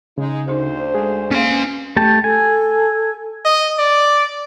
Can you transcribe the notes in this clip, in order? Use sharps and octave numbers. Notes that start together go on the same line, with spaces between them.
C#3 G#3 D#4
D2 D#4 G#4 C5
G#3 G#4 A4
A#3 C#4 F5 C6
A3 G4 A5
A4 G#5
D#5
D5